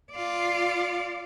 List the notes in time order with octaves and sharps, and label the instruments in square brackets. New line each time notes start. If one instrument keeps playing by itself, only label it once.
[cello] F4 D5